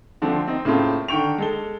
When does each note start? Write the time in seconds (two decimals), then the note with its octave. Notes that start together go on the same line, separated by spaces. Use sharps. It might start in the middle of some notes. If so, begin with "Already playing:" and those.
0.22 D3 F3 A3 C4
0.48 C4 D#4
0.65 A2 C#3 A#3 C4 F4 A5
1.08 D3 D#3 G5 C#6 F7
1.38 G#3 A4 G7